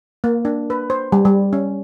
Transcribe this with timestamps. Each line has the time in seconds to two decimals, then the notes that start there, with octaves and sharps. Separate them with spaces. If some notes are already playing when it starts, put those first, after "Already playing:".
0.24 A#3
0.45 D4
0.70 B4
0.90 C5
1.12 G3
1.25 G3
1.53 C#4